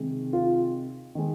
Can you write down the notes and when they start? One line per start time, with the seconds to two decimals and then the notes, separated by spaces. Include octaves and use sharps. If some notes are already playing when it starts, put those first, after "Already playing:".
Already playing: C3 D#3 G#3
0.33 F4
1.15 D#3 G#3